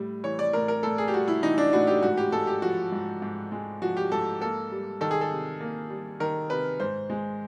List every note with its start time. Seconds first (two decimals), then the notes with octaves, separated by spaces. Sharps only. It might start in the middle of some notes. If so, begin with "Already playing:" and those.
Already playing: A2 G3
0.24 E3 C#5
0.39 D5
0.53 A2 A#4
0.68 A#4
0.83 A2 A4
0.98 G#4
1.08 G4
1.13 G3 F#4
1.28 E4
1.43 E3 D#4
1.58 D4
1.73 A2 F#4
1.87 G4
2.03 G#2 F#4
2.17 G4
2.32 G#3 A4
2.47 G4
2.62 F3 F#4
2.92 G#2
3.22 G#2
3.52 G#3
3.82 F3 F#4
3.97 G4
4.12 G#2 A4
4.41 A#3 A4
4.72 G3
5.01 D#3 A4
5.11 G#4
5.21 A4
5.31 C3
5.61 A#3
5.90 G3
6.20 D#3 A#4
6.50 C3 B4
6.80 G#2 C5
7.10 G#3